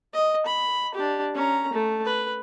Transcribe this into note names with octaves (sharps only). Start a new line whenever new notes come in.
D#5
B5
D4 G4
C#4 A#5
A3
B4